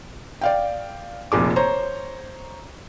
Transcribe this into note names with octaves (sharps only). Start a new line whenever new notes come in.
D5 F5 G5
F1 A#2 G#4 D6
C5 C#5 A#5